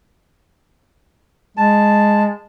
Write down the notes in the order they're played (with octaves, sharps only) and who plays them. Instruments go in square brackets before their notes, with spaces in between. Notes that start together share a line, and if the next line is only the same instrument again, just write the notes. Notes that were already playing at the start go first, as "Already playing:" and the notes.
[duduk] G#3 [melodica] A5